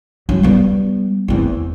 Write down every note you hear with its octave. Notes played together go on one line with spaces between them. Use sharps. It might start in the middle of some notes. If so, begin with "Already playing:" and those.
F#3
G3 B3
E2 C4